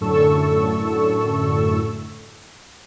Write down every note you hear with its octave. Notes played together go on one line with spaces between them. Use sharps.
F#2 A2 D3 A4 C#6 E6